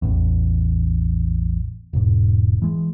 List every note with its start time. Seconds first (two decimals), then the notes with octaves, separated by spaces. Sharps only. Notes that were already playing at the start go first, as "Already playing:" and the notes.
0.02 A1 E2
1.93 E1 G#2
2.62 E3 G#3